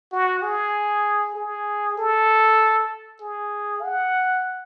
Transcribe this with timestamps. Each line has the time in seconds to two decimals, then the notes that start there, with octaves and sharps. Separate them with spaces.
0.12 F#4
0.43 G#4
1.35 G#4
1.98 A4
3.21 G#4
3.83 F#5